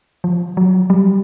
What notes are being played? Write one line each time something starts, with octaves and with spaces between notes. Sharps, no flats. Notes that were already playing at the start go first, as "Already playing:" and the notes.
F3
F#3
G3